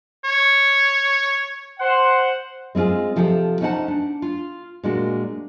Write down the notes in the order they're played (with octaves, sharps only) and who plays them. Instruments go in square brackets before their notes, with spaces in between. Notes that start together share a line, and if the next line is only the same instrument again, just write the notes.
[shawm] C#5
[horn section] C5 F#5
[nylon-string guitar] G#3 C4 D4 F4 G#4
C3 F3 C4 G4 A4
C#4 D#4 C5 D#5 F#5 A5
D4
F4
A#2 G#3 D4 F#4